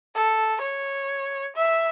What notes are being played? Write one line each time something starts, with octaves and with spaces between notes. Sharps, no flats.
A4
C#5
E5